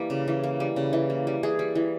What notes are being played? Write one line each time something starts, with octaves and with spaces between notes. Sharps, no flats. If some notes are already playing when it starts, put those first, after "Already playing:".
Already playing: E3 G3 A#3
C#3
E3
A#3
G3
C#3
E3
A#3
G3
E3 G#4
G3
E3